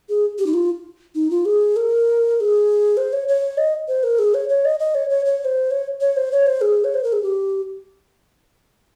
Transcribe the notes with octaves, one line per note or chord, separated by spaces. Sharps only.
G#4
G4
D#4
F4
D#4
F4
G#4
A#4
A#4
G#4
C5
C#5
C#5
D#5
C5
A#4
G#4
C#5
C#5
D#5
D#5
C#5
C#5
C#5
C#5
C5
C#5
C#5
C5
C#5
C5
G#4
C#5
C5
A#4
G#4
G4